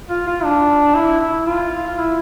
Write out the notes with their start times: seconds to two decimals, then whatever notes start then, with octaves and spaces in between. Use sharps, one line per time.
0.10 F4
0.27 F4
0.44 D4
0.95 E4
1.21 E4
1.46 F4
1.98 E4